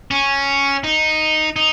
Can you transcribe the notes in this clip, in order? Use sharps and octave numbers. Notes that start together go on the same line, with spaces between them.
C#4
D#4
D#4